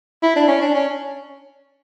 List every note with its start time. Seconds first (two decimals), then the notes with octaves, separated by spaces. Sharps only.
0.23 E4
0.36 D4
0.48 C#4
0.62 D4
0.75 C#4